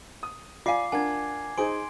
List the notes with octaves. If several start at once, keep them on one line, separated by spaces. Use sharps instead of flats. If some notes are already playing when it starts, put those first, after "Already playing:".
D#6
F4 D5 F5 G#5 D6 C7
D4 A#4 F#5 G#5 G#6
D#4 G#4 C5 C6 D7